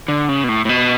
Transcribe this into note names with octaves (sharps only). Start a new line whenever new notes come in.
D3
C#3
B2
A2
A2
B2